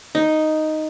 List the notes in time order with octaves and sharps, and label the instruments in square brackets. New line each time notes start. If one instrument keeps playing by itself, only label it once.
[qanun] D#4